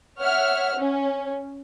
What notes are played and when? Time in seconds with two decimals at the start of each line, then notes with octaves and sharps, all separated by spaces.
0.20 C#5 E5 F#5 F6
0.77 C#4